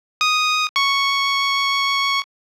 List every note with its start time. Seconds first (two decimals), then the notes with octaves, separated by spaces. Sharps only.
0.21 D#6
0.76 C#6